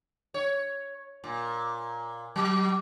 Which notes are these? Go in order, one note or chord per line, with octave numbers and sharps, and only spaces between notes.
C#5
A#2
F#3